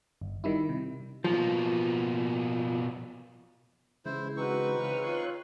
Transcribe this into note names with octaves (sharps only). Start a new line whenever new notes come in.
G1
D#3 G3 E4
C3
B2 F3 A#3
C#3 E3 G#3 E4 C5
C4 D#4 F#4 B4 C#6
C#3 F6
F4 C#5 C6 F#6